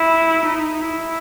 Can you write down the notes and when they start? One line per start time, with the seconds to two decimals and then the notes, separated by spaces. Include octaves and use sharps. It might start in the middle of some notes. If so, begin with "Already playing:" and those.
Already playing: E4
0.46 D#4
0.81 E4